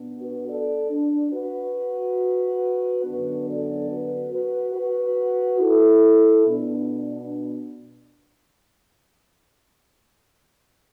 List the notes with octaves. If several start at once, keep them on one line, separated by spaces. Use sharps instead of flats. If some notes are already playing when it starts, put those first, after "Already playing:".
Already playing: B2 B3 D4
F#4 B4
A4 D5
D4
F#4 B4
F#2 D3 B3 D4 F#4 B4
A4 D5
F#4 B4
F#4 B4
F#4 B4
E4 A4
B2 B3 D4